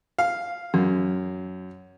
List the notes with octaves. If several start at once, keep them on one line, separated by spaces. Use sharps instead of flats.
F5
F#2